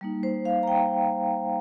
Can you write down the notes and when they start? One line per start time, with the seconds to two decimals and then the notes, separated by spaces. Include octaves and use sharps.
0.01 G3 A#3 D#4
0.23 C5
0.45 F5
0.63 A#5
0.68 G5